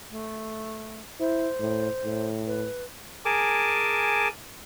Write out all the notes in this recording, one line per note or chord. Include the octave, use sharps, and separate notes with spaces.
A3
E4 C5
A2
A2
B4
G#4 A#4 G#5 A5 D6